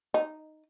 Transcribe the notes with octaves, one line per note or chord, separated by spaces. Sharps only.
D#4